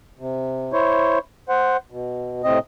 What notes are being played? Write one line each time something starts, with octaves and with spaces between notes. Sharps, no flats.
C3
E4 C5 C#5
C5 F#5
B2
A2 C3 C4 D#5